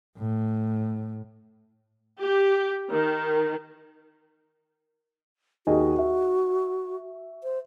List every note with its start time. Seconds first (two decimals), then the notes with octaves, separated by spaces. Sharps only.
0.18 A2
2.21 G4
2.90 D#3
5.67 D#2 F#4 G#4 D#5
5.99 E5
7.44 C5